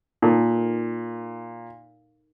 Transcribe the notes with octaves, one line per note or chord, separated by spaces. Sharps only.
A#2 D#4 A4 A#4